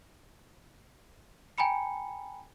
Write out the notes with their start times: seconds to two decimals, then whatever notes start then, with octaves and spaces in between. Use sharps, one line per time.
1.58 G5 G#5 A#5 B5 C#7